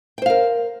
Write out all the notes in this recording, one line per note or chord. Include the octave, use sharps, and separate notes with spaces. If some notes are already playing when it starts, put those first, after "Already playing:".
A#4 C5 F5 G5